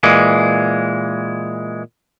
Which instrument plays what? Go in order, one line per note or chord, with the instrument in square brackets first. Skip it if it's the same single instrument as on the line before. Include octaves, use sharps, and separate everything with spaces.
[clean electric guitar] A#2 E3 G#3